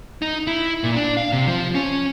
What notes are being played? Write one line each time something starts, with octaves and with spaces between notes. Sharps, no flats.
D#4
E4
A#2
D4
F5
C3
F3
C#4